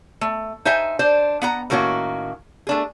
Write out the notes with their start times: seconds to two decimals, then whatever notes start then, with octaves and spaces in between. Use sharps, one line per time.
0.21 A3
0.65 D#4 C5 E5 G#5
0.99 D4 C5 D5
1.42 B3 F#5 A#5
1.70 A2 D#3 A#3 C#4 F#4
2.67 A3 D4 G#4